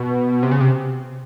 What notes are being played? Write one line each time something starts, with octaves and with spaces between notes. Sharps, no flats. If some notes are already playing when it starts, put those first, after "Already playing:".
Already playing: B2
C3
C#3
C3